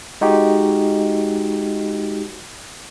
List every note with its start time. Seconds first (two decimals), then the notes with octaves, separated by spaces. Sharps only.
0.21 G#3 D#4 F#4 G4